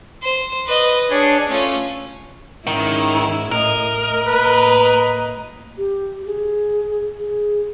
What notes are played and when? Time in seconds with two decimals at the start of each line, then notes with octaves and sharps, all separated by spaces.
0.22 C5
0.66 B4 D#5
1.11 D4 G#4 C#5 D5
1.49 A3 C#4 F4
2.67 G#2 D#3 C#4 E4
3.52 A2 A#4 D#5
4.27 A2 A#3 B4 D#5
5.78 G4
6.27 G#4
7.19 G#4